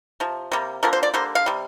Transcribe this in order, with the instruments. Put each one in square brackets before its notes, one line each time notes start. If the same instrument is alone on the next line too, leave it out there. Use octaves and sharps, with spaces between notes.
[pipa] C3 F3
C3 G3 A#3
D3 F3 A#3 A#4
C5
D5
D3 G3 A#3 C5
F5
C3 G3